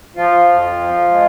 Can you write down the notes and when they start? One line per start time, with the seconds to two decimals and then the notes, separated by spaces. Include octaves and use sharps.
0.16 F3 F4
0.48 F2
0.79 F3
1.11 G#3